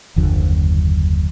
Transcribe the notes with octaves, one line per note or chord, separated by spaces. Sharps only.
F#1 D#2 D3 F3